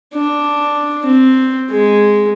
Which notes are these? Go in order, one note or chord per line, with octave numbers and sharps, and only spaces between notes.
D4
C4
G#3